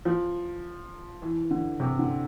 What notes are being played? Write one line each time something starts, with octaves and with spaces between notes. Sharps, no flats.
F3
E3
D3
C3
D3